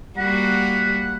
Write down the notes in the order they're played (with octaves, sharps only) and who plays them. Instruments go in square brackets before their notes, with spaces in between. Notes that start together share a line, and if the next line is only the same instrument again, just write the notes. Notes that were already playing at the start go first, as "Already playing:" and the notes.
[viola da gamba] G3 A#3 F#4 [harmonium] F#5 [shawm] B5